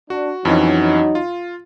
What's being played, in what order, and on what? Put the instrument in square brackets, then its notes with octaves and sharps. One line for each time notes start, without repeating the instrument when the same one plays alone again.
[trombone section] D4 [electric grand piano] F#4
[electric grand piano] F2 E3 C#4 [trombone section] F#3 D#4
[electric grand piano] F4